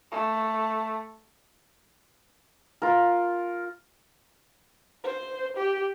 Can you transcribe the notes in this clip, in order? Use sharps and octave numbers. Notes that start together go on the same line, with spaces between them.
A3
F4 A#4
C5
G4